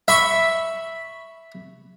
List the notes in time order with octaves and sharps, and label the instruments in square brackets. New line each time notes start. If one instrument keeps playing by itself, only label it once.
[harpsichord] E5 B5 C#6